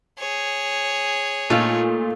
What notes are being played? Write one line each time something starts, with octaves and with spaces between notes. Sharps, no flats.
G#4 C#5
A#2 A3 D#4 F4